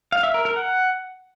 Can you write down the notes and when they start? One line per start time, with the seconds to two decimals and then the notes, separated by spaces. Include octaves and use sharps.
0.12 F5
0.23 E5
0.34 A#4
0.45 A#4
0.56 F#5